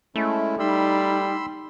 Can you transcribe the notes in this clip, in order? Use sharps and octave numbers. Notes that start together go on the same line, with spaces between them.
G#3 A3 C#4 E4
G3 D#4 B5 C6 E6